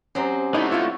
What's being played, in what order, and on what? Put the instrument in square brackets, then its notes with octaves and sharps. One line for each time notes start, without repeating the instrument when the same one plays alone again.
[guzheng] F#3 C4 D#5 [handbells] C#4 G4
[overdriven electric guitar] D3 A3 [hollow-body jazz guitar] D#4 E4
[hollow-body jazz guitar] E4 F4 [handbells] C#6